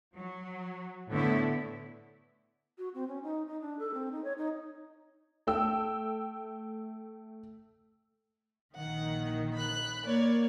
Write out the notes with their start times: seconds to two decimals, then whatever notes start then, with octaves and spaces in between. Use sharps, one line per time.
0.16 F#3
1.10 A2 D3 A3 B3 E4
2.78 F#4
2.94 C4
3.08 C#4
3.23 D#4
3.47 D#4
3.61 D4
3.79 A4
3.94 C4
4.12 D#4
4.24 C#5
4.38 D#4
5.47 A3 G5 E6
8.75 A#1 D#3 F#5
9.54 B5 F#6
10.05 A#3 C#5 D5